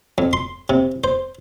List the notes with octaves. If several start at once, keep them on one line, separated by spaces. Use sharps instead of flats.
F2
C6
C3
C5